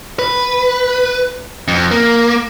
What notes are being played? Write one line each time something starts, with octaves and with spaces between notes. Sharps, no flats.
B4
F2
A#3